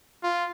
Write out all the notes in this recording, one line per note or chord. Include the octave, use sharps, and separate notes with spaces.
F4